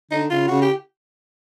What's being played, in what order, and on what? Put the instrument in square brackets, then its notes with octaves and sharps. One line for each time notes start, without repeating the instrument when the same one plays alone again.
[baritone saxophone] D3 [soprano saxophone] D#4
[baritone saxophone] C#3 [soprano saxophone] F4
[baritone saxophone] C#3 [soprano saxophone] F#4
[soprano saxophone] G4